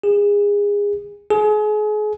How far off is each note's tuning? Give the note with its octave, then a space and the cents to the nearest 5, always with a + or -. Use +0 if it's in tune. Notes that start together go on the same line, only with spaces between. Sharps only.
G#4 -25
G#4 +35